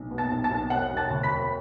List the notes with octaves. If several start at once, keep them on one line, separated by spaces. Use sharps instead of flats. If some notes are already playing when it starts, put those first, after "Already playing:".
Already playing: B1
B2
A5 A6
B1
A5 A6
B1
E1 F#5 F#6
E1
A5 A6
D2
B5 B6
E1